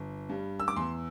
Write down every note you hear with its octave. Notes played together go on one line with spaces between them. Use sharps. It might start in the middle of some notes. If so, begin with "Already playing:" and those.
Already playing: G1
G2 G3
E6
D6
E2 C6